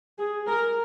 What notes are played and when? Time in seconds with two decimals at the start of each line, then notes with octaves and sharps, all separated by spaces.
0.19 G#4
0.47 A#4